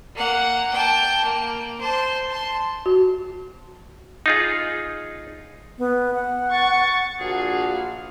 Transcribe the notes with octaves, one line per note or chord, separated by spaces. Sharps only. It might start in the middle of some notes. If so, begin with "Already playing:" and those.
A#3 F#5
G5 A5
A#3
C5 A5
A5 C6
F#4
D#4 F4 G#4
B3
F#5
C#6 A6
A#1 A#2 F3 F#4 G#4 F5